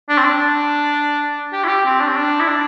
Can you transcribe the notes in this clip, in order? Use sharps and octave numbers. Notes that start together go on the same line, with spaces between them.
D4
C4
D4
G4
E4
G4
C4
D4
C4
D4
E4
D4